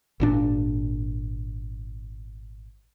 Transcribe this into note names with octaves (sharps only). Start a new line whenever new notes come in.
G#1 A#2 D4